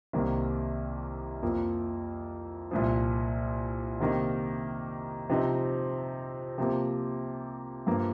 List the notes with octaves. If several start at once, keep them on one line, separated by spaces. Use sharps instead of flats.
C2 C3 D#3 A#3
F2 F3 A#3
C2 A#2 F3
C3 D#3 A#3 D#4
C3 F3 C4 D#4
C3 F3 A#3
G2 F3 A#3